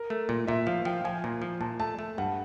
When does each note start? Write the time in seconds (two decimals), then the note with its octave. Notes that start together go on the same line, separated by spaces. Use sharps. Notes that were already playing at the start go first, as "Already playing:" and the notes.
Already playing: A#4
0.10 A3
0.29 A#2
0.47 A#2 E5
0.66 F3 F5
0.85 F3 G5
1.05 F3 G#5
1.24 A#2
1.42 F3
1.61 A#2 A5
1.80 A3 A5
1.99 A3
2.18 G2 F#5